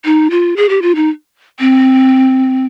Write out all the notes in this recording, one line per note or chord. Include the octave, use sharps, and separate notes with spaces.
D#4
F4
G#4
G4
F4
D#4
C4